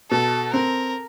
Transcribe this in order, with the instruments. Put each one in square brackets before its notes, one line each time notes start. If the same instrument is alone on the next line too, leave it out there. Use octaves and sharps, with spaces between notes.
[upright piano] B2 [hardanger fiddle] A4
[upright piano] C4 [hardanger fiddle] A#4